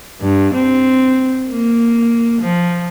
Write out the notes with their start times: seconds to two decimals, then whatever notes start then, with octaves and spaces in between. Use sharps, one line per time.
0.21 G2
0.54 C4
1.49 A#3
2.41 F3